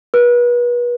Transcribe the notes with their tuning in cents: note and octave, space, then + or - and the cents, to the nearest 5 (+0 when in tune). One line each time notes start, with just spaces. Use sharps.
B4 -35